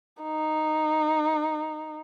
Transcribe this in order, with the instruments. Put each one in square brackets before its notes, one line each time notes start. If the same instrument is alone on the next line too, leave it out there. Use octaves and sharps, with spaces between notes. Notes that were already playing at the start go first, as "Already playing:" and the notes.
[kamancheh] D#4